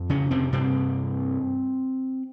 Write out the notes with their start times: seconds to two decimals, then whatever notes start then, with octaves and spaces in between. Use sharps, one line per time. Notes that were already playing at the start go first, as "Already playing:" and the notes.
Already playing: F2
0.09 C#3 C#4
0.31 C3 C4
0.52 G2 C3 C4